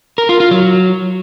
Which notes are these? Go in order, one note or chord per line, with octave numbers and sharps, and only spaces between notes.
A#4
F4
F4
F#3